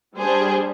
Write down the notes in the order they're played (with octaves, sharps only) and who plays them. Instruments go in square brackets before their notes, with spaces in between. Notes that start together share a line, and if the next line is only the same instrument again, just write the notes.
[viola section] G3 [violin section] D4 G#4 C5